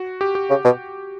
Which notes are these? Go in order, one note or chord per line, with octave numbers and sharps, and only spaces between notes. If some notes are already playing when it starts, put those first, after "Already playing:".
Already playing: F#4
G4
G4
C#3
B2